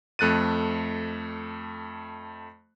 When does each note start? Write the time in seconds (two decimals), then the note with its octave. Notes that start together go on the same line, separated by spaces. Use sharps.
0.19 F2 A3 F#6 A6 D#7